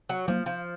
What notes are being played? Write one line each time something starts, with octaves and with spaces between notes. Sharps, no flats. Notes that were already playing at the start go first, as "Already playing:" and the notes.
F#3
F3 F#3 A#3
F3